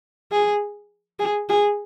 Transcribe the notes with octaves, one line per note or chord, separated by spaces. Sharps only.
G#4
G#4
G#4